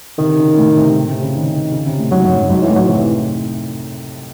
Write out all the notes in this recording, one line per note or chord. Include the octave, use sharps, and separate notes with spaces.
C3 D#3
C#3
A2
C3
A2
C3
C#3
D#3
D#3
C#3
C3
A2
G#2 F#3
F#2
F#2
G#2 F#3
E3
A2
F#3
C3 E3